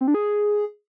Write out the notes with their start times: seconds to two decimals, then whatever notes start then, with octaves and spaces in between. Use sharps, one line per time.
0.01 C4
0.08 D4
0.14 G#4